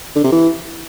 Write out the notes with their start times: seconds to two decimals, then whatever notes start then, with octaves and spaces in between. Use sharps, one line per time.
0.16 D3
0.24 C3
0.32 E3